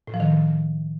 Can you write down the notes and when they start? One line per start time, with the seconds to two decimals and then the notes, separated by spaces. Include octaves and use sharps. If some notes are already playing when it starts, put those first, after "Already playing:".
0.07 A2
0.14 F3
0.20 D#3